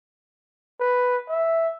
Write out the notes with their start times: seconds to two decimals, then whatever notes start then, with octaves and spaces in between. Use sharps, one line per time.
0.80 B4
1.29 E5